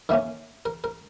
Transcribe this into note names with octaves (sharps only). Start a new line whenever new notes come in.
D#3 A#3 C#4 E5
A#4
A#4